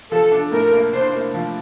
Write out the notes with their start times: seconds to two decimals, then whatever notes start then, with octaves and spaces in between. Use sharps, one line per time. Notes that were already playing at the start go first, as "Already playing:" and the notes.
0.11 F3 A4
0.32 D4
0.52 A2 A#4
0.72 A#3
0.93 D4 C5
1.13 A#3
1.34 F3